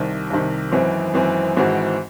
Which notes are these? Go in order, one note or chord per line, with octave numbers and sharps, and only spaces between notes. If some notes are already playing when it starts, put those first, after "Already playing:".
Already playing: C2 C3 D#3
C2 C3 D#3
G#1 F#2 E3 C4
G#1 F#2 E3 C4
G#1 G#2 E3 C4 F#4